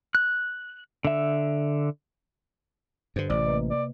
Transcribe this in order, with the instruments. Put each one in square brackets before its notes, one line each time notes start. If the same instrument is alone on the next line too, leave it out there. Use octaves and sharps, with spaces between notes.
[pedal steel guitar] F#6
D3 E5
[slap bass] G2 D3 [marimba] C5
[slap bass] A1 [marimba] C3 [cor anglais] D5
[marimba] A#3 B4 D#5
[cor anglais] D5